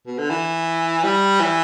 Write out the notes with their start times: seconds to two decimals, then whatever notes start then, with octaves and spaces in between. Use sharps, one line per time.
0.06 B2
0.18 D3
0.30 E3
1.04 G3
1.40 E3